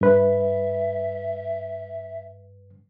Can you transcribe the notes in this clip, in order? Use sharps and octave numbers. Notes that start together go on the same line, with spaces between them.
G2 B4 E5